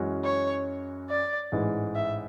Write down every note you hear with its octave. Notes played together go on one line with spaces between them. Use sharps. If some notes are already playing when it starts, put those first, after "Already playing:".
Already playing: F#2 E3 G#3 C#4 F#4
C#5
D5
A1 G#2 E3 G#3
E5